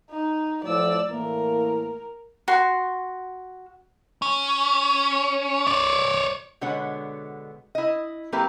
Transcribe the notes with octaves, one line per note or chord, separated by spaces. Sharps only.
D#4
A2 F3 D5 E6
A2 E3 A#3 A#4
F#4 C6
C#4
C#5 D5
B2 D3 G#3 B3 C#5 F#5
E4 D#5
F#3 A#3 C4 E4 G4 B4